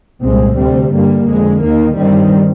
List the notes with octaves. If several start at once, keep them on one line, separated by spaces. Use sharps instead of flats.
C2 A#2 G#3 C4
D2 C3 G3 C4
G2 D3 G3 A#3
F2 D3 G#3
D#2 D#3 A#3
G2 D#3 G3 C4